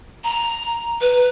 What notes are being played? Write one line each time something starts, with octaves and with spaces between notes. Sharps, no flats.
A#5
B4